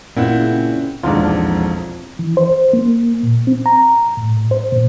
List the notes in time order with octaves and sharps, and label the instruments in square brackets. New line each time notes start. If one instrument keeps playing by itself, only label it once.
[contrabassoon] A1 [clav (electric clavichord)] A#2 [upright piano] C4 E4 F#5
[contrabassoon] C#3
[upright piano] E1 A#1 G#2 [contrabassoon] F2 [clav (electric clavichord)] D4 F4
[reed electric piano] E3
C5
A#3
A#2
C4
A#5
A2
C5
A#2